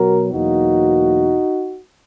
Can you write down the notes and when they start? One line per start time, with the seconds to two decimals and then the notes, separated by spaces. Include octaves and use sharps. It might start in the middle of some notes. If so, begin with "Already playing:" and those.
Already playing: B2 F#3 B3 F#4 A#4
0.32 E2 B2 F#3 A#3 D#4 F#4